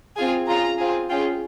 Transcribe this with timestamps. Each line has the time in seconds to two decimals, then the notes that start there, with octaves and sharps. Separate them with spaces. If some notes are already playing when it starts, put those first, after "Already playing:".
0.16 C4 F4 G#4 G#5
0.47 C#4 F4 G#4 A#5
0.78 C4 F4 G#4
1.09 C#4 F4 G#4 G5